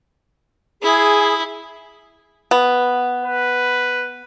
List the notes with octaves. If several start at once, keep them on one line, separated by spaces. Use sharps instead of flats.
E4 G#4
B3
B4